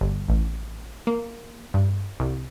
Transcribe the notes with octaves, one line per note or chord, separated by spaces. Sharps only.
G1
A1
A#3
G2
C2